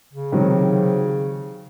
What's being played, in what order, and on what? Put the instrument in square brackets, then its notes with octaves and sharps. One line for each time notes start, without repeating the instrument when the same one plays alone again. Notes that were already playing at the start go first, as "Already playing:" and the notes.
[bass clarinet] C#3
[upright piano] C3 D#3 F#3